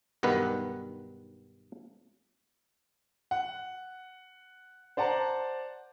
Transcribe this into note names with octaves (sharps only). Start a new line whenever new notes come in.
B1 G2 D#3 B3 B4 F#5
F#5
C5 D5 F#5 A5 A#5